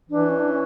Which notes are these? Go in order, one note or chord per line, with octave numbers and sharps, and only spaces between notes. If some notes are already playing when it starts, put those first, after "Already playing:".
E3 D4
C#4
D4
C#4